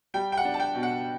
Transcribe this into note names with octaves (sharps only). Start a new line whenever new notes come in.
G3 G5
G5
F#5
D4
A5
G5
B2
F#5